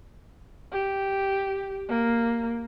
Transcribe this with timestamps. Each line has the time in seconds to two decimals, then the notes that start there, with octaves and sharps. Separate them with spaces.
0.72 G4
1.89 A#3